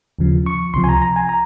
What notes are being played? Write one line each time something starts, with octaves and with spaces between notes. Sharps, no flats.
D#2 C#3 F3
C#6
C#2 C3 F3 C6
G#5
A#5
A#5
G#5
A#5